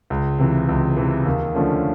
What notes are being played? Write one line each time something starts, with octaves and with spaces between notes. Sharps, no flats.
C#2
C3 E3
C#2
C3 E3
D#2
D3 F3 A3 C#4